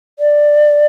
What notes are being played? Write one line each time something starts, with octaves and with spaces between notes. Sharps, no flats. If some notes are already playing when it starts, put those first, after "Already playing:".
D5